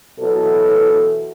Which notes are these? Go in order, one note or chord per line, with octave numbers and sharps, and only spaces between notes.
B2 E3 F#3 A4